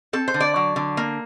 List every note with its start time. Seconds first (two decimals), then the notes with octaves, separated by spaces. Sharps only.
0.13 C4 A4
0.28 C5
0.34 D3
0.40 D5
0.56 F#3
0.76 D3
0.97 A#3